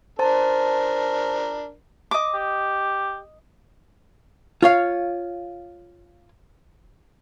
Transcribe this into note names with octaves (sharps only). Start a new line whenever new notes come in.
D4 A#4 C5 A5
D#5 D6
G4
F4 C#5 F5